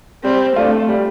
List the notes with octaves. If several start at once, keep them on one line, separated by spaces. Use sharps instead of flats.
G3 C4
A3 D4 F4
G3